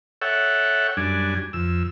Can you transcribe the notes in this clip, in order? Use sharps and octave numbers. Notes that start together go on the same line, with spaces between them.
A4 C#5 E5 F#5 G5
F#2 G3 D4 G#5
F2 E6